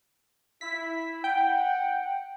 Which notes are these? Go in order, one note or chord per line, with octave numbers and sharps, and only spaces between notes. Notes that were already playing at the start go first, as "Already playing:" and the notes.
E4 B6
F#5 G5